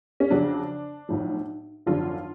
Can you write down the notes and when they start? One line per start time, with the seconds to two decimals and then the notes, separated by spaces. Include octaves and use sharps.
0.20 C#4
0.31 F2 C#3 F#3 D4
1.09 B1 A2 F3
1.86 G#1 F#2 D3 F3 F4